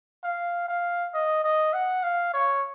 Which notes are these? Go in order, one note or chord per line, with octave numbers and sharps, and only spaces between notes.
F5
F5
D#5
D#5
F#5
F5
C#5